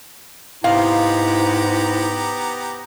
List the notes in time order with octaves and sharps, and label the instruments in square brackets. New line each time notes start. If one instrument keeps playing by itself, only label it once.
[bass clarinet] G#2 [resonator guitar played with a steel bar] C3 D#5 F5 [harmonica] B3 G4 A#5 [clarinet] E4